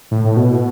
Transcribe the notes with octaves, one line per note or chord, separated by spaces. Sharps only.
A2
A2
B2